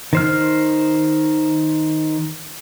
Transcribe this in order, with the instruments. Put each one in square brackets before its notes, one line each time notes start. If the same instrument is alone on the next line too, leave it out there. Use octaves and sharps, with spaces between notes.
[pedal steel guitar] D#3 C5 F6